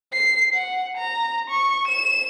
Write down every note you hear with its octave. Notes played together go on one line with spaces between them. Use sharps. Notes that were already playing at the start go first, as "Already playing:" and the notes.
C7
F#5
A#5
C#6
E7